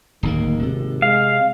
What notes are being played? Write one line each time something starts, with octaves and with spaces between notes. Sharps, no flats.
D1 D#2 D#3 A#3
G#1 C3
G#3 F5